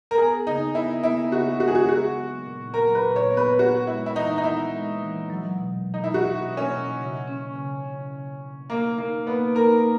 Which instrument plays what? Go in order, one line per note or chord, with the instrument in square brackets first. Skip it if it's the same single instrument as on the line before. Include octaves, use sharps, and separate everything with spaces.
[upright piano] A#4
[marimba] B3 [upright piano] G#4
[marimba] C#3 [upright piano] D#4
[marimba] B3 [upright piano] E4
[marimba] B3 [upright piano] E4
[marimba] C#3 [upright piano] F#4
[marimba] G#3 [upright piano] F#4
[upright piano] G#4
F#4
[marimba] B3 [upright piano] F#4
[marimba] F#3
A#2
[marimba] F#3 [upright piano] A#4
[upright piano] B4
[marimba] A#2
[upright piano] C#5
[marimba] B3
[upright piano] B4
[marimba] B3 [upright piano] F#4
[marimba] G#3 [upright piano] E4
[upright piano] E4
[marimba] E3 [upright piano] D#4
[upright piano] D#4
[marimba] B3 [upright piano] E4
[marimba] G#3
E3
F#3
B2
F#3
[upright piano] D#4
E4
[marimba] C#4 [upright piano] F#4
[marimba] B2
[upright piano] C#4
[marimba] B2
C#3
C#4
C#3
C#4
C#3
C#3
[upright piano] A#3 [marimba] D#4
[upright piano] A#3 [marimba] D#4
[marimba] A#3 [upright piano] B3
[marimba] D#4 [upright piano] A#4